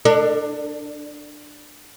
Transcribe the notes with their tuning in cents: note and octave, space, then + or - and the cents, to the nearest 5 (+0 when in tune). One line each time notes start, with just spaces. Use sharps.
D4 +15 A#4 -40